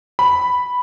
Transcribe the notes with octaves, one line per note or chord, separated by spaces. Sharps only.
B5